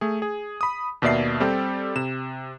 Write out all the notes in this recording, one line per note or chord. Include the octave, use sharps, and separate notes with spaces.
A3 G#4
G#4
B5 D#6
D#2 B2 A#3 D5 E5 C7
G3 C4 G4 A4 G5
C3 E7